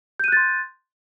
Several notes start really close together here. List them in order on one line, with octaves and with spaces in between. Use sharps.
G6 D#7 F#6 A6 C6